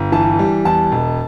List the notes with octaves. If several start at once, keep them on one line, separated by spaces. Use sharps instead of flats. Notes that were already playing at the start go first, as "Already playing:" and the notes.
Already playing: G1
E3 A5
G3
E2 A5
E1